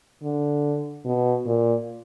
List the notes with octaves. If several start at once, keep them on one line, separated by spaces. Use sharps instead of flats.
D3
B2
A#2